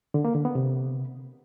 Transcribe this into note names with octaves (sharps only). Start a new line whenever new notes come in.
D3
A#3
D3
B3
C3